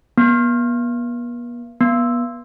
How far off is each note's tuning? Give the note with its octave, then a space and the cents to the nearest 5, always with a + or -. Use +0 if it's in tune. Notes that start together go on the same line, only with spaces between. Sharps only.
B3 -45
B3 -30